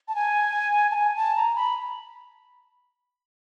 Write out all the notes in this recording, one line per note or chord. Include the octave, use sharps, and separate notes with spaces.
A5
G#5
A5
G#5
A5
A#5
B5